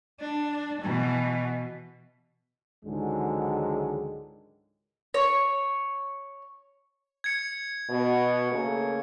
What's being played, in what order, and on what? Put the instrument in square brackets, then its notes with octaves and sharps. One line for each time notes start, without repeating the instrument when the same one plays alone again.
[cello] D4
B2 E3
[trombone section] C#2 G#2 D3 D#3 F#3 G#3
[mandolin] C#5
[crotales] G#6 C#7
[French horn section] B2
C#3 A3 A#3